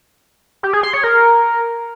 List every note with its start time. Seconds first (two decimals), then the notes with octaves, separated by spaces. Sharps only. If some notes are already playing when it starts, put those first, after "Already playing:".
0.63 G4
0.73 G#4
0.83 C6
0.93 C#5
1.04 A#4